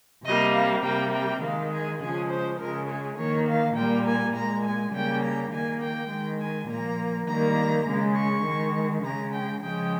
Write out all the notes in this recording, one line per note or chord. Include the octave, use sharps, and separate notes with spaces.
C3 G3 A#3 D#5
F5
C3 G3 A#3 G5
G5
D#3 G#3 F5
G#4
C#3 F3 G#3 G#4
C5
C#3 G#3 A#4
G#4
D#3 A#3 C#5
F5
A#2 G3 A#3 G5
G#5
A#2 G#3 A#5
G#5
C#3 G3 A#3 G5
A#5
D#3 A#3 G#5
G5
D#3 G#3
G#5
A#2 F3 A#3 A#5
D#3 G3 A#3 A#5
C#3 G#3
C#6
D#3 G#3
C#3 G#3 A#5
G5
C#3 F3 G#3 G5